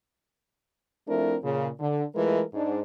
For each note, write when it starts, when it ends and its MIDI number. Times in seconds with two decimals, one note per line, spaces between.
1.08 1.36 53
1.08 1.36 57
1.08 1.36 60
1.08 1.36 62
1.08 1.36 64
1.08 1.36 70
1.43 1.69 46
1.43 1.69 49
1.80 2.04 50
2.15 2.42 52
2.15 2.42 56
2.15 2.42 57
2.15 2.42 65
2.15 2.42 70
2.15 2.42 71
2.54 2.81 44
2.54 2.81 62